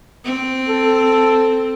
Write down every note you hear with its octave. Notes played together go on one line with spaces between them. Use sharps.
C4
A4